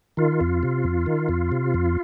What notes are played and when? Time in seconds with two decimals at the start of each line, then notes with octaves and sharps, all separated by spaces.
0.17 D#3 F4
0.41 F2
0.63 C3
0.84 F2
1.06 D#3
1.29 F2
1.52 C3
1.74 F2